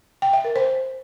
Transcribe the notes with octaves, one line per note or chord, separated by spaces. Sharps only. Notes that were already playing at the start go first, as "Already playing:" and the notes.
G5
E5
A#4
C5